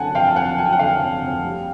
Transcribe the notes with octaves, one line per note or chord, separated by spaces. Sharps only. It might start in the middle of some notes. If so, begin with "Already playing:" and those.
Already playing: D3 F#3 F#5 G#5 A5
F2 F5 G5
A5
F2 F#5 G#5
F#3 G#5
G5
F#5
D3 F5 G5
F2
F2
G3